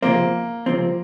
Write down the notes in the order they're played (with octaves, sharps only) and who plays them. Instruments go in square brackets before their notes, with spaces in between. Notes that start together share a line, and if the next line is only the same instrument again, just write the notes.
[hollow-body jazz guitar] C#2 C3 F3 C4 [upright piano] A#3
[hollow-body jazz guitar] C#2 C3 F3 C4